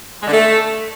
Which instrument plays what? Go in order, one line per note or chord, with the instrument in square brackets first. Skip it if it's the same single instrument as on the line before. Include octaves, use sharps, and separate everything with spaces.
[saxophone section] G#3
D3
A3